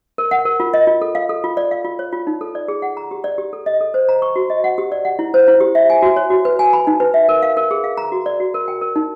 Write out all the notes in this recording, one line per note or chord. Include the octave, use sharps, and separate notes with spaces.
A#4
F#5
A#4
F4
D#5
F4
A4
F5
A4
F4
D5
F5
F4
C#5
F4
D#4
A4
D5
G#4
F#5
A#5
G4
D5
G4
A4
D#5
A4
C5
A#5
C#6
F#4
D#5
F#5
G4
D5
F#5
E4
C5
E4
G4
E5
G#5
F#4
C#5
F#4
B4
G#5
B5
D#4
B4
E5
A#4
F5
A#4
G#4
F5
A#5
F#4
D5
F#4
A#4
G5
A#4
D#4